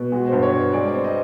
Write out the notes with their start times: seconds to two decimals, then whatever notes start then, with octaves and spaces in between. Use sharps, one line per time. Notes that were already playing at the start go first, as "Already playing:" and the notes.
Already playing: B2
0.12 G#3 F#4
0.27 C5
0.33 G2
0.43 C#5
0.53 G2
0.73 G#3 D5
0.94 C4
1.04 D#5